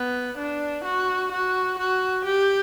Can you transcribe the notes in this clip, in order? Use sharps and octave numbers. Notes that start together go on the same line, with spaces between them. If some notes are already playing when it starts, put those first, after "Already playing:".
Already playing: B3
D4
F#4
F#4
F#4
G4